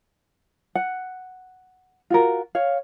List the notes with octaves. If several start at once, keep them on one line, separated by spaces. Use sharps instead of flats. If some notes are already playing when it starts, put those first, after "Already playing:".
F#5
F4 F#4 A#4
C#5 F5